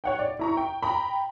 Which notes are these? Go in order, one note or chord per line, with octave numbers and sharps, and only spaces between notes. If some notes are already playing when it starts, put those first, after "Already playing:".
C#5 F#5 G5
D5
E4 A#5 C#6
G5
G5 A#5 B5